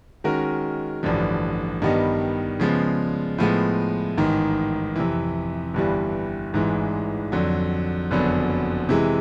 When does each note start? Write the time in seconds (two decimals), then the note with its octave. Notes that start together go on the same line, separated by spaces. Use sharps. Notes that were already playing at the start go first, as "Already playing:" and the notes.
0.24 D#3 G#3 C#4 F#4 A#4
1.03 A1 G2 D3 F3
1.82 G2 D#3 G3 B3 D#4
2.60 C#3 F3 G#3 B3
3.38 A2 F3 G#3 B3
4.17 A1 G#2 D#3
4.96 F2 C3 E3
5.74 G1 G2 E3 G3
6.53 A1 G#2 E3 G#3
7.32 F2 D3 F#3
8.11 F#1 F2 D3 F#3 B3
8.89 C3 E3 G#3